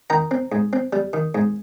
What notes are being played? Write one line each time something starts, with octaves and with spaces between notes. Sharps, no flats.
D#3 G5 A#5
C4
G#2
C4
G3
D#3
G#2